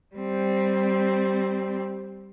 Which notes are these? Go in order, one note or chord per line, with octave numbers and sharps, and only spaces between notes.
G3 C4